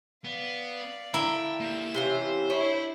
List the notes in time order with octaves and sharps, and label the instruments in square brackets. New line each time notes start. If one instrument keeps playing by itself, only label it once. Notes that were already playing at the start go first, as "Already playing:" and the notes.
[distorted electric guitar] B3 [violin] D5 F5
[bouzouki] D3 A#5 [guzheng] E4 [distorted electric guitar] G5
[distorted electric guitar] A#3 G4 [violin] E7
[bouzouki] C3 E3 F4 [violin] C#4 [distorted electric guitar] C5
[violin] D4 E4 [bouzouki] C#5